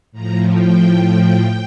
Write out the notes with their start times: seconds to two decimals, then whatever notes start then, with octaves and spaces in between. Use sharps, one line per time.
0.12 A2 F3 A#5
0.46 G5